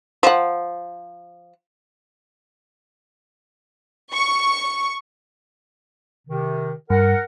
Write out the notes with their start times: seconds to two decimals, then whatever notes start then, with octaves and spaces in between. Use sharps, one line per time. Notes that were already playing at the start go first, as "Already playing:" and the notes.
0.23 F3 F#5
4.13 C#6
6.28 C3 D#3
6.90 G2 A#4 F#5